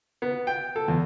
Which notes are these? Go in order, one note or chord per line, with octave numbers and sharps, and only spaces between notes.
B3
G5
A4
E2